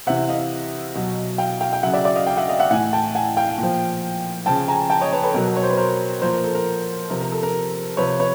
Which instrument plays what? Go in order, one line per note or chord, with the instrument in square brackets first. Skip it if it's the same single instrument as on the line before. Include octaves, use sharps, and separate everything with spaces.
[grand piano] C3 E3 E5 F#5
D#5 F5
B2 F#3
F5 G5
F5 G5
G5
C#3 F#3 E5 F#5
D5 E5
D5 E5
D#5 F5
F5 G5
E5 F#5
D#5 F5
E5 F#5
A2 E3 F#5 G#5
G5 A5
F#5 G#5
F5 G5
A#2 F3
C#3 F3 G5 A5
G#5 A#5
G5 A5
C#5 D#5
B4 C#5
A4 B4
B2 F#3 A#4
C#5
C5
B4
A#4 C5
A#2 F3 A#4 C5
A#4
A4
A#4
C3 F3 A#4
A#4
A4
A#4
C3 F3 B4 C#5
B4 C#5